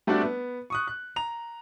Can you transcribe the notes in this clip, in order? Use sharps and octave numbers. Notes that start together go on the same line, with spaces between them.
G3 A3 C4 D4 F#4 D5
B3
C#6 D#6 F#6
F#6
A#5 F7